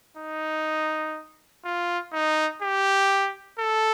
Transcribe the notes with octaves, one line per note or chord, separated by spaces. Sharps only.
D#4
F4
D#4
G4
A4